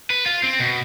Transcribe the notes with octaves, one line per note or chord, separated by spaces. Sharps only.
B4
F4
C4
B2